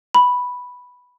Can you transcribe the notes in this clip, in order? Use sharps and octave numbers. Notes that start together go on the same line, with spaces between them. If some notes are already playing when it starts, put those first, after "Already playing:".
B5